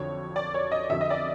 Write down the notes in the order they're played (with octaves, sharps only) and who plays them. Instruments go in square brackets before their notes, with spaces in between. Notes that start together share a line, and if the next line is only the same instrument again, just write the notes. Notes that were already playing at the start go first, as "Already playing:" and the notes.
Already playing: [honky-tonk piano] F2 D3 F#3 C#5
D5
C#5
D#5
F2 D3 F#3 E5
D#5
D5